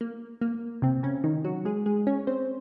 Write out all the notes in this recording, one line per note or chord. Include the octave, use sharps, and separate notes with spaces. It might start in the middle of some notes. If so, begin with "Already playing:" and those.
A#3
A#3
C3 C4
C#3 C#4
D#3 D#4
F#3 F#4
G#3 G#4
G#3 G#4
C#4 C#5
C4 C5